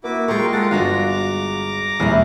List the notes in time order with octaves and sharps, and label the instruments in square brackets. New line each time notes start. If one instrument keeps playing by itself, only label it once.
[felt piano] A#3 [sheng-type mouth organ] E4 F#4 D6
[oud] G#3 A#4 [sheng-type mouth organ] F4 G5 C#6
[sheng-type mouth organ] F4 A4 F#5 [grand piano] A6 A#6
[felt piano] G1 [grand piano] F4 F#4 [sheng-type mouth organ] A#5 D6
[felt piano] E1 [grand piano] D#2 E3 G3 [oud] C#3 C#4 E4